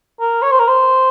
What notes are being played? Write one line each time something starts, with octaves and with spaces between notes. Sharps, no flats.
A#4
C#5
C5
A#4
C5